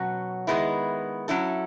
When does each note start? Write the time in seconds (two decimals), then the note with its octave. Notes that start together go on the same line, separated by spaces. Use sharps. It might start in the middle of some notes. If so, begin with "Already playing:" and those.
Already playing: B2 F#3 C#4 F#4
0.47 D#3 G#3 B3 E4
1.28 F#3 C#4 E4 A4